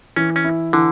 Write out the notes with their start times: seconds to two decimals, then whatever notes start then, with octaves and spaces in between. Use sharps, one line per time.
0.16 E3 C#4
0.36 C#4
0.45 E4
0.73 D3 E3